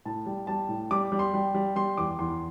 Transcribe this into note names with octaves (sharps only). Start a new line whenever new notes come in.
A2 A5
G3
G3 A5
A2
G3 D6
G3
C6
G3
G3
G3 C6
E2 D6
E2 C6